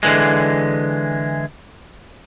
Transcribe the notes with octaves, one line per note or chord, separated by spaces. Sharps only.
D3 E3 G#3